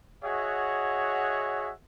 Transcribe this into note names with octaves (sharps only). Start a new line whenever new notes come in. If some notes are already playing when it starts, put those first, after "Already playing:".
F#4 G#4 C#5 D#5 E5 F#5